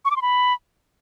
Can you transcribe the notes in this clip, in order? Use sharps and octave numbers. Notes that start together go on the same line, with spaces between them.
C#6
D6
C6
B5